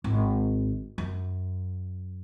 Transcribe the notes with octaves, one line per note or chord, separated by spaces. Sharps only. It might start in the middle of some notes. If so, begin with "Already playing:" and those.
G#1
F#2